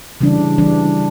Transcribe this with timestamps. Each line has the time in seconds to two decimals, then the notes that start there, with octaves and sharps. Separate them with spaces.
0.21 C#3 E3 G3 D4
0.58 E3 G3 D4